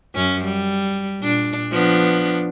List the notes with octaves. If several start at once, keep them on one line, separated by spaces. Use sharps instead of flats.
F#2 C#4
G3
A#2 D4
F3 B3 D4